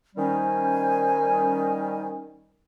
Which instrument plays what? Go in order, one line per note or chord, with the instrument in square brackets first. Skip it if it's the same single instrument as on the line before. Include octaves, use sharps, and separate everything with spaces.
[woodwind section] D#3 G3 C#4 [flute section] C5 G#5